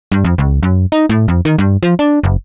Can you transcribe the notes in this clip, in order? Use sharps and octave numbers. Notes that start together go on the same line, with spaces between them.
G2
F2
C#2
F#2
D#4
A2
F2
D#3
G2
F3
D4
F#1